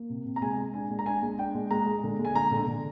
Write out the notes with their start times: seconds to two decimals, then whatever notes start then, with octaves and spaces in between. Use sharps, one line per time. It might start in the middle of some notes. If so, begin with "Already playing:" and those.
Already playing: A#3
0.10 C3
0.25 C3
0.36 A#5
0.42 G#3 G#5
0.58 G#3
0.74 D4 G#5
0.90 G#3
0.99 A#5
1.06 D4 G#5
1.22 G#3
1.38 D4 G5
1.55 G#3
1.71 G#3 A#5
1.87 G#3
2.04 D3
2.19 G#3
2.25 G#5
2.35 D3 A#5
2.51 D3
2.67 D3